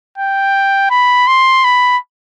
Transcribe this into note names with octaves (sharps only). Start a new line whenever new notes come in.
G5
B5
C6
B5